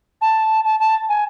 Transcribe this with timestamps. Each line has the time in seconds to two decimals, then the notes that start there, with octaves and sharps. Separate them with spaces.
0.21 A5
0.64 A5
0.79 A5
1.08 G#5